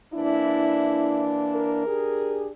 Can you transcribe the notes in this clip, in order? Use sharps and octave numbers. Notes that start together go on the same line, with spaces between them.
E3 A#3 D4 E4
A#4
D4 G4 G#4